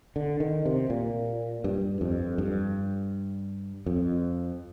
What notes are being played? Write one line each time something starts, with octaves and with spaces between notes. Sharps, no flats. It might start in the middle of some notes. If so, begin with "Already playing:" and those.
D3
D#3
C3
A#2
G2
F2
G2
F2